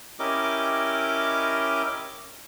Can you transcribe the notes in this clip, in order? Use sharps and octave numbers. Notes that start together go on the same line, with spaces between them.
C#4 E4 G4 A#4 D#5 D6